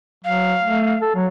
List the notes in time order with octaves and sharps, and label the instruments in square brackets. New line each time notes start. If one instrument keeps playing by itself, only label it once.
[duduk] F#3 [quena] F5
[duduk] A3
A4
F#3